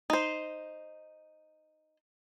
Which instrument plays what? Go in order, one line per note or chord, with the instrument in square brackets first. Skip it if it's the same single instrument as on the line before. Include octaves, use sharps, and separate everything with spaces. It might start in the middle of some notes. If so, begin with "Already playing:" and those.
[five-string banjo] D#4 C5